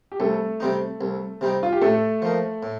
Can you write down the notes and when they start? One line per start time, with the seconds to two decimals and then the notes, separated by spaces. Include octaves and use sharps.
0.12 G4
0.20 C2 A3 A4
0.60 C3 G3 C4 D#4
1.01 C2
1.41 C3 G3 C4 D#4
1.63 F4
1.72 G4
1.82 A2 A3 A4
2.22 F3 A#3 D#4
2.63 A2